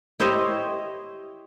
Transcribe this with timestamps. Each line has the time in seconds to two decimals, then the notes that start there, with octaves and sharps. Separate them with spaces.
0.20 E4 G4 C5 C#5 D#5